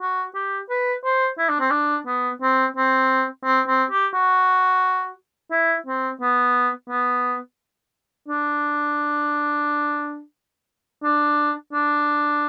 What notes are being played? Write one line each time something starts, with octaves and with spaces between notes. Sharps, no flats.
F#4
G4
B4
C5
E4
D4
C4
D4
B3
C4
C4
C4
C4
G4
F#4
E4
C4
B3
B3
D4
D4
D4